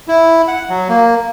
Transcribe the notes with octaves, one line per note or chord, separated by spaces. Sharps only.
E4
F#5
F#3
A#3